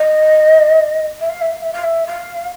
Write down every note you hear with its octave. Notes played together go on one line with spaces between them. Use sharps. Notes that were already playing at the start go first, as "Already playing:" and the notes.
Already playing: D#5
E5
F5
E5
F5
E5
F5
E5
F5